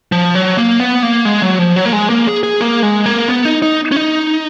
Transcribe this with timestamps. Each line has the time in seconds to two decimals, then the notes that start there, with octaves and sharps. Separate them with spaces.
0.12 F3
0.35 F#3
0.57 A#3
0.80 B3
1.03 A#3
1.25 G#3
1.42 F#3
1.59 F3
1.76 F#3
1.86 A#3
1.93 G#3
2.10 A#3
2.27 G#4
2.43 G#4
2.61 A#3
2.83 G#3
3.06 A#3
3.29 B3
3.45 D#4
3.62 D#4
3.92 C#4
3.96 D#4